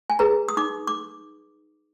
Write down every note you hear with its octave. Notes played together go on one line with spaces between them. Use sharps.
G#5
G#4 B4 A#5
D#6
D#4 D6
D6